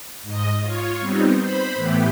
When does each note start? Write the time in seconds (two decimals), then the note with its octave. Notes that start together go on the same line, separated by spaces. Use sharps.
0.23 G#2 D#5
0.61 F4 C#5
1.00 G3 B3 C4 D#4
1.40 C5 B5
1.75 A2 E3 A3 B3 G4